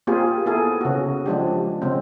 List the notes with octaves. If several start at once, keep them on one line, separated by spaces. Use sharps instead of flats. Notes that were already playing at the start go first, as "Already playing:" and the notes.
A#3 C4 F4 G4 G#4
B3 E4 G#4 A4
C#3 F#4
F3 G#3 D4 G4
C#3 G#3 C4